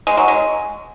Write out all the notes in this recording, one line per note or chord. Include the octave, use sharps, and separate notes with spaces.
G#3
F#3
G#3